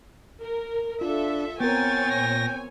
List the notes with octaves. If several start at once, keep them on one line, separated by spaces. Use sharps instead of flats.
A#4
D4 F4 A4 E5
B3 C4 A#4 C#5 G5 G#5 A6
A#2 A#6